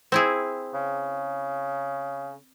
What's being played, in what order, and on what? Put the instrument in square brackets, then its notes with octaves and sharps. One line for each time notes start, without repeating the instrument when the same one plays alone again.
[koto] C4 E4 G#4
[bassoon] C#3